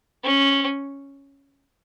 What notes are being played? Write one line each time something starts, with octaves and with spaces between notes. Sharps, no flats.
C#4